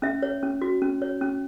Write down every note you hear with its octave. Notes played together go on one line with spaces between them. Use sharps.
C#4 E5
C#5
C#4
F#4
C#4
C#5
C#4